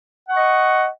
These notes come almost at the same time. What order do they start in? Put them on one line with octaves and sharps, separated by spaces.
F#5 C#6 D#5